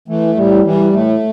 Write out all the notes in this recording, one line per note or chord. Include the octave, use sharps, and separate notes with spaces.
E3 A3
A2 G3
E3 G3
A2 A3